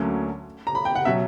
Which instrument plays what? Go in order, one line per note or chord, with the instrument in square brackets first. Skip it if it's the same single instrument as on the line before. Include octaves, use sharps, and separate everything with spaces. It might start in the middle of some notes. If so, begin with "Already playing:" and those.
Already playing: [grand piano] D2 D3 F#3 A#3 C#4
[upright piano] A#5
B5
G5
F#5
[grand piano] B2 F#3 [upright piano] E5